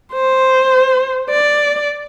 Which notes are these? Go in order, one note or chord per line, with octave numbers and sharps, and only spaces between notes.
C5
D5